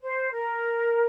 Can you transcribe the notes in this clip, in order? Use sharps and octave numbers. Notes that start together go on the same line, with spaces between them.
C5
A#4